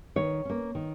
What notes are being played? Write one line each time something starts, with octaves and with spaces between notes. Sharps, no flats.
D#3 C#5
A#3 C#4
D#3